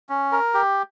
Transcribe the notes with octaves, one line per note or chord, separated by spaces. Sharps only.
C#4
A#4
G4